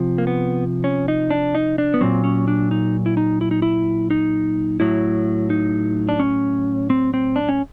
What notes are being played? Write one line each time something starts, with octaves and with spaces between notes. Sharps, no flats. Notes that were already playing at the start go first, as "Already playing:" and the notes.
Already playing: C3 F3
A#3
B3
C#4
D#4
D4
D#4
D4
B3
A#2 F#3 C4
C#4
D4
D#4
E4
D#4
E4
D#4
E4
D#4
A2 F#3 E4
D#4
D4
C#4
C4
C4
D4
C#4